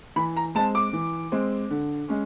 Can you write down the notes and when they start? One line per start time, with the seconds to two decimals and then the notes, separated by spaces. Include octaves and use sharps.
0.16 E3 B5
0.36 A#5
0.55 G#3 C4 A5
0.75 D6
0.93 E3
1.32 G#3 C4
1.70 D3
2.09 G#3 C#4